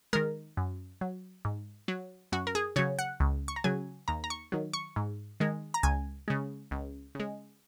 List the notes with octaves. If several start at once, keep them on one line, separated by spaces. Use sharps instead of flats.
D#3 G#3 A#4
F#2
F#3
G#2
F#3
F#2 F#4
A#4
G#4
C#3 F#3 C#5
F#5
C#2
C#6
A#5
C#3 F#3 G#5
D#2 A#5
A#5
C#6
D#3 F#3
C#6
G#2
D#3 G#3
A#5
C#2 G#5
C#3 G#3
C#2
C#3 G#3